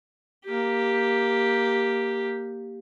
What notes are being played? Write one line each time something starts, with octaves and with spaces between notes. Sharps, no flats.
A#3 G4